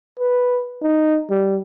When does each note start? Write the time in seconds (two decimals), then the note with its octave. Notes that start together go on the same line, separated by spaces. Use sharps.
0.19 B4
0.82 D#4
1.30 G3